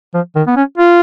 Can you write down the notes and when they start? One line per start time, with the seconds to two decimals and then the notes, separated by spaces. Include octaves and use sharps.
0.14 F3
0.35 D#3
0.47 B3
0.56 C#4
0.78 F4